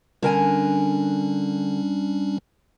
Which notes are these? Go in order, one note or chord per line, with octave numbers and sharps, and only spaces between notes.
D3 G3 C#4 D4 A#4 G#5